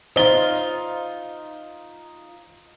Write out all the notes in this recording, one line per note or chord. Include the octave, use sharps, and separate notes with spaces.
D#4 F4 C5 G7